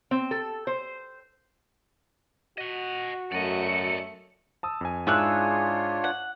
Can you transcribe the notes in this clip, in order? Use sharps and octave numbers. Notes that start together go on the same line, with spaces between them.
C4
A4
C5
F#4 D#5 F#5
F#2 A3 D5 D#5 C#7
A5 D#6 E6
F2 G#5
G#2 D4 E4 F4 G#4 C#5 E6 F#6
F#5